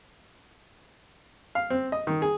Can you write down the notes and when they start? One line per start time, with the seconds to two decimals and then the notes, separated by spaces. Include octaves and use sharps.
1.55 F5
1.70 C4
1.92 D#5
2.07 D#3
2.22 G#4